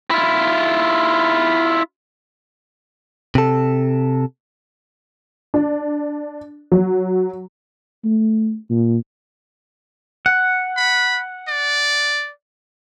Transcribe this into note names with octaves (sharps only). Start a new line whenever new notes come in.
E4 F4
C3 A4
D4
F#3
A3
A#2
F#5
B5
D5